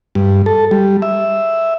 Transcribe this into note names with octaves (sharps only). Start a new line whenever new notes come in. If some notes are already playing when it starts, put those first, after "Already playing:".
G2
A4
G3
E5